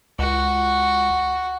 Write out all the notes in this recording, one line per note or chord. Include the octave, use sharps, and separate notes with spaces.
C#2 F#4